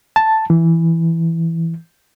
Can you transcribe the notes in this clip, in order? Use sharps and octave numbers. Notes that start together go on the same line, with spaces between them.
A5
E3